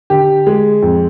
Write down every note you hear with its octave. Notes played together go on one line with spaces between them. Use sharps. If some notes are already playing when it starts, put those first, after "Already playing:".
D3 G4
G#3
F2